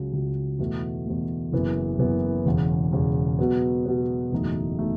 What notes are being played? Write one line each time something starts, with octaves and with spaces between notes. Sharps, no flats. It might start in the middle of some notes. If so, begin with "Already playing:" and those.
Already playing: C#2 C#3 F#3
C#2 C#3 F#3
E2 B2 A3
E2 B2 A3
F#1 F#2 E3 B3
F#1 F#2 E3 B3
E1 E2 C#3
E1 E2 C#3
B2 F#3 B3
B2 F#3 B3
F#1 E2 B2 A3 D#4
B2 A3 D#4